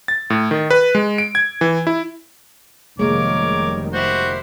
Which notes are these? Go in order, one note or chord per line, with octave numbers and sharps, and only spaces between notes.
A6
A2
D#3
B4
G#3
D7
G#6
E3
E4
F1 D#3 G3 G#3 A#3 A#4 C#5 D6
E4 F#4 G4 C5